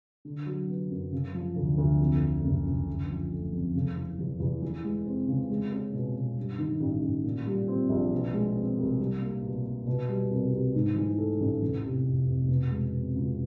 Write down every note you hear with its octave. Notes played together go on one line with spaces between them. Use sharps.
D3
F#3
B3
F#2
C#3
F3
D2
D2
F2
D3
F#1
F#1
D3
F3
A3
F2
C#3
E3
E2
E2
E3
G#3
C4
C#3
G#3
C#4
B2
B2
G2
D#3
A1
A1
A#2
G3
C4
A#1
B2
G#3
C4
C2
G3
A#3
B2
B2
B2
G3
C2
C2
G#2
E3
A3
A1
E2
C3
F1
F1
B2
G#3
C4
C#2